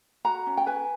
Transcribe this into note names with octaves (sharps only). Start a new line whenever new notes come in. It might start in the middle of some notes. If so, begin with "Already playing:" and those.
F#4 A#5
C#4
G5
B4 G#5